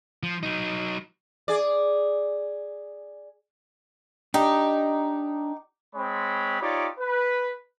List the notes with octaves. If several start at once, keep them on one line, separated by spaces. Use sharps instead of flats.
F3
F#3 D#4
G#4 D5
D4 D#4 G4
G#3 C4 C#5 B5
D#4 F4 G4 C#5 D5
B4